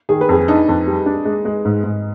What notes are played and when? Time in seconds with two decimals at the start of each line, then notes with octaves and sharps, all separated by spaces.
0.09 D#3 G#4
0.21 B4
0.29 F2 G#4
0.48 D4 D#4
0.68 F2
0.87 G3
1.06 D4
1.25 G#3
1.45 G#3
1.65 G#2
1.84 G#2